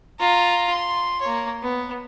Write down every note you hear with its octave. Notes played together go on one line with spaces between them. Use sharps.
F4 A#5
C6
A#3 C#5
B3